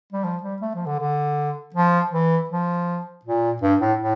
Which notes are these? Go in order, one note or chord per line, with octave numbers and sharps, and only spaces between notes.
G3
F3
G3
A3
F3
D3
D3
F3
E3
F3
A#2
G2
A2
A2